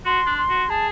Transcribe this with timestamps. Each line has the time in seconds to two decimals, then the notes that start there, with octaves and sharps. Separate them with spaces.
0.05 F#4 C6
0.26 D4
0.38 C6
0.49 F#4
0.70 G#4 A5